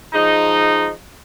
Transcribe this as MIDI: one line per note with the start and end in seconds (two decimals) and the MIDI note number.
0.13 0.91 53
0.13 0.91 56
0.13 0.91 63